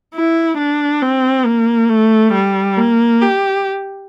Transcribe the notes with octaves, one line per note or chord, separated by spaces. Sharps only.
E4
D4
C4
A#3
A3
G3
A#3
G4